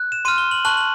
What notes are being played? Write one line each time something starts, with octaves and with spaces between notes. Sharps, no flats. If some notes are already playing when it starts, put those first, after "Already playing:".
Already playing: F#6
E7
C6 F6 D#7
G7
F#7
A5 C#6 F#6 F#7
F#7